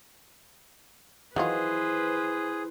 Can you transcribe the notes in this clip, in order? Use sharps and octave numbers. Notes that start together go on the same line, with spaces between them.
D#3 E3 F#3 F4 G#4 B4 C5